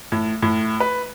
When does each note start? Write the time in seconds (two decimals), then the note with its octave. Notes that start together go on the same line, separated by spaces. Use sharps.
0.12 A2
0.42 A2
0.80 B4